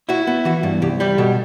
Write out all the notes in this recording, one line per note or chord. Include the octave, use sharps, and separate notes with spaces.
E4 F#4
B3
E3 F#4
G2
C2 G4
G3 G4
B2 A4